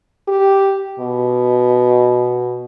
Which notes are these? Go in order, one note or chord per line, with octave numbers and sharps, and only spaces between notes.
G4
B2